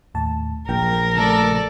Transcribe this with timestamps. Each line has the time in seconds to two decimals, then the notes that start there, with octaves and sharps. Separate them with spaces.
0.15 D#2 A2 A5
0.69 A#1 A#4 G5
1.15 C#3 A3 A4 D5